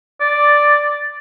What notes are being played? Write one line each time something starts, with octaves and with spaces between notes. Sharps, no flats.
D5